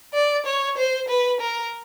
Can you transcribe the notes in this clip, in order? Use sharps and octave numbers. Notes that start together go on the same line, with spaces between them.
D5
C#5
C5
B4
A#4